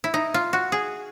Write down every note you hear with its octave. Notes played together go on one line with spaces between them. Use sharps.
E4
D#4
F4
F#4
G#4